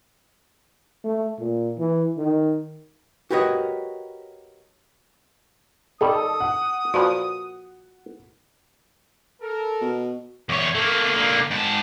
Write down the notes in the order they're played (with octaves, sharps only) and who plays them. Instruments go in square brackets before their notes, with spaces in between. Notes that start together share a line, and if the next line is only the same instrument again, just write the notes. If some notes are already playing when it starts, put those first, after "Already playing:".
[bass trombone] A3
A#2
E3
D#3
[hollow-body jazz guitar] F#4 G4 A#4 B4 C#5 D#5
[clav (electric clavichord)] D#3 G3 [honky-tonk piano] A4 [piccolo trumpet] D#6
[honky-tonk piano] F#5
[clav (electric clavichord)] A#2 F3 B4 [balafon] F#4
[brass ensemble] A4 A#4
[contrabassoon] B2
[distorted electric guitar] E2 C#5
A3 A#3
D3 A#3
G#2 A5